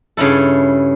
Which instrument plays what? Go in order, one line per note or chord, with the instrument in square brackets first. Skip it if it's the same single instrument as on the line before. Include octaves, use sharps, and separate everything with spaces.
[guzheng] G2 C#3 C#4 E4 A4